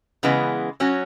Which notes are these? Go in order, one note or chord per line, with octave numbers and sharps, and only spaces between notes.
C#3 E3 G#3 B3
F#3 C#4 F#4